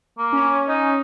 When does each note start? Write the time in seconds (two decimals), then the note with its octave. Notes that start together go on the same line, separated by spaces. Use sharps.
0.18 A#3
0.32 C#4
0.68 D#4